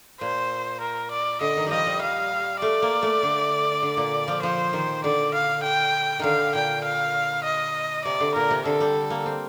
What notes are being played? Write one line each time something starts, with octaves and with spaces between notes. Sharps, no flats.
A#2 C5
A#4
D5
D3 D#5
D#3
F3 G3 D#5
G3
F5
A3 D5
A#3
A3
D3
D3
A#2
F3
F3 C5
D#3
D3 D5
F5
G5
D3 D#3 F5
A#2 G5
F5
D#5
C3 D5
D3
A#2 A#4
C3
D3 A4
G3
A#3
C4